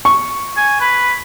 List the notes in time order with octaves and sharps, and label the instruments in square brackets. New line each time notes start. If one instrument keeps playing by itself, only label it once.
[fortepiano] C#6
[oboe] G#5
B4